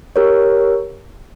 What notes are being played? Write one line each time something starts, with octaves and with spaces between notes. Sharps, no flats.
G4 A#4 C#5